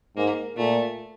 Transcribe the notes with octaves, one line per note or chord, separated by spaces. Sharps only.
G#2 A#3
A#2 A3